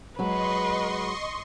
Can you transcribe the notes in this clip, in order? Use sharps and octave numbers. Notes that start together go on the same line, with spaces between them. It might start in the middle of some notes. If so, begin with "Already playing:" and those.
F#3 G#3 F#4 B4 D#5 C6 C#6